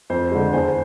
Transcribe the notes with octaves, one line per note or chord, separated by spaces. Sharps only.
F2 C5
D3 G#3
E2 C5